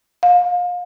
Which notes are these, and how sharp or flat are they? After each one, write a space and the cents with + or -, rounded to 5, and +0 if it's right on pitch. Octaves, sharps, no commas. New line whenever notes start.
F5 +30